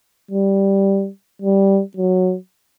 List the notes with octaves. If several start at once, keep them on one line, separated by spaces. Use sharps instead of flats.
G3
G3
F#3